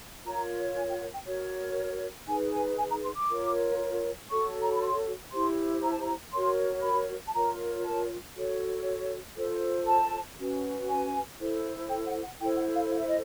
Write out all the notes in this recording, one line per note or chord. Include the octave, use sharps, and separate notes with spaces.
F4 A#4 C#5 A#5
G#5
G5
F#5
G5
F#4 A#4 C#5
D#4 G#4 B4 G#5
G#5
G#5
A#5
C6
D6
F4 A#4 C#5
F#4 A4 C#5 C#6
A#5
B5
C6
E4 G4 C5 C6
A#5
A5
A#5
F#4 A#4 C#5 C6
B5
A5
F4 A#4 C#5 A#5
A5
F#4 A4 C#5
F4 A4 C5
A5
C#4 F#4 B4
G#5
E4 A4 C5
G5
F#5
F#5
E4 A4 C5 G5
F#5
F5
F5
E5
D#5